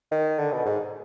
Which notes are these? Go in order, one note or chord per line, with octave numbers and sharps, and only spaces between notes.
D#3
D3
B2
G#2